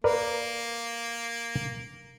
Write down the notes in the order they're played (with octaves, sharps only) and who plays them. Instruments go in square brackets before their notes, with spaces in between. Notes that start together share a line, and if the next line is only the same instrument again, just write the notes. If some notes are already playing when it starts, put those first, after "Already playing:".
[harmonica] A#3 [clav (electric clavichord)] A#4 B4 D5